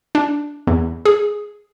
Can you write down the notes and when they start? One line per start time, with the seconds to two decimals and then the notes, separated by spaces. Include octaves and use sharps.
0.15 D4
0.67 E2
1.05 G#4